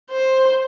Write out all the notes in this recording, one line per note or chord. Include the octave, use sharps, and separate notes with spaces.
C5